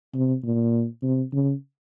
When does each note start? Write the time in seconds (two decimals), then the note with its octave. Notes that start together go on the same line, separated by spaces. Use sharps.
0.14 C3
0.44 A#2
1.03 C3
1.32 C#3